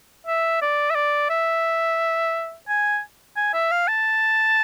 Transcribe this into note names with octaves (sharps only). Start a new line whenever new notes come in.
E5
D5
E5
D5
E5
G#5
G#5
E5
F5
A5